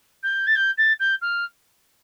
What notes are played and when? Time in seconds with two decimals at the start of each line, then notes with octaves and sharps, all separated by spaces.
0.23 G6
0.46 A6
0.55 G6
0.77 A6
0.99 G6
1.21 F6